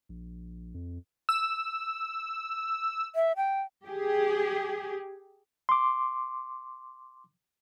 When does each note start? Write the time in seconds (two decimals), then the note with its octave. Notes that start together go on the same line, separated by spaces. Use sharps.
0.09 A#1
0.74 F2
1.29 E6
3.15 E5
3.37 G5
3.86 G4 G#4
5.69 C6 D6